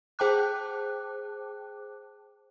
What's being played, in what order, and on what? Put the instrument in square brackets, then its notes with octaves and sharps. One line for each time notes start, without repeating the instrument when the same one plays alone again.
[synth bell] G#4 C5 G5 A5 D6 F#6